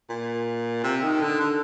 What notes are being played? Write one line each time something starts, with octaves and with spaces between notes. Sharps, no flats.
A#2
C3
D#3
D3
D3